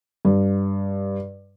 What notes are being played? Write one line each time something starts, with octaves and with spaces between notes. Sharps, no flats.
G2